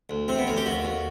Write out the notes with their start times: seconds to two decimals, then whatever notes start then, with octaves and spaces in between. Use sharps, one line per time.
0.10 D2
0.28 C3 C4
0.38 B3
0.47 D2 C#4
0.57 G4
0.66 D#2 F#4
0.85 D#2